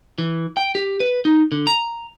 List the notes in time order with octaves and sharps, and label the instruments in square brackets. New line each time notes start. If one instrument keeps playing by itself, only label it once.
[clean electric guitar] E3
G5
G4
B4
D#4
D3
A#5